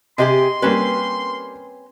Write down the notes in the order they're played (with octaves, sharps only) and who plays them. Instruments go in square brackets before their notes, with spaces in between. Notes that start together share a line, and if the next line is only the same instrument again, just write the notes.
[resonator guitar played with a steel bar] C3 G4 G#4 [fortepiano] D#5 [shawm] C6
[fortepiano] G3 A#3 [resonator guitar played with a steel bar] C4 C#4 B4